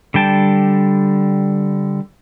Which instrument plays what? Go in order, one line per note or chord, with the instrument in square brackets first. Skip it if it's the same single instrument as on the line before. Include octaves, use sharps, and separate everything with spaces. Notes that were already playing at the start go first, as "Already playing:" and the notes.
[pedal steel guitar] D3 G3 G5 A5